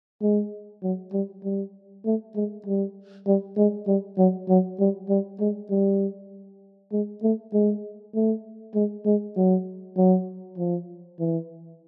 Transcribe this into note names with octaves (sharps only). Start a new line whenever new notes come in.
G#3
F#3
G3
G3
A3
G#3
G3
G3
G#3
G3
F#3
F#3
G3
G3
G#3
G3
G#3
A3
G#3
A3
G#3
G#3
F#3
F#3
F3
E3